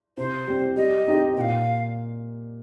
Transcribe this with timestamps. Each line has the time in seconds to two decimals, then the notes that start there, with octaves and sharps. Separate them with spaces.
0.17 C3 C5
0.47 G3 C4
0.77 G3 D#5
1.07 C4 D#4 G4
1.37 A#2 G5
1.41 F5